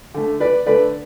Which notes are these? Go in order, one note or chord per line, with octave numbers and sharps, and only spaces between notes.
D3 A3
B4 D5
D3 A3 B4 D5